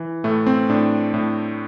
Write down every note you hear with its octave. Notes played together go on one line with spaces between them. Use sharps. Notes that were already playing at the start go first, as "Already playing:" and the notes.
Already playing: E3
A2 A3
C4
A2 D4
A2